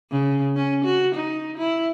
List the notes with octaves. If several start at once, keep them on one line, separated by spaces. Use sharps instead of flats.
C#3
C#4
F#4
D#4
E4